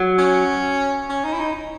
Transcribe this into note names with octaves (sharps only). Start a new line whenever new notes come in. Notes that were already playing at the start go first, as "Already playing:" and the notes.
Already playing: F#3
C#4
C#4
D#4
E4
D#4